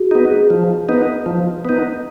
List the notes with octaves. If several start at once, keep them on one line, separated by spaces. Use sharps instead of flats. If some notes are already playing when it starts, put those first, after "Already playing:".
Already playing: F#4 G#4
B3 D#4
G#4
F3
B3 D#4
F3
B3 D#4